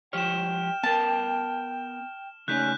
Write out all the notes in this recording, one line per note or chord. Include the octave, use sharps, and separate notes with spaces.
F3 G4 C#5 G5 F6 E7
B3 A#4 A5
C#3 A3 C#4 D#4 F#6 G6 B6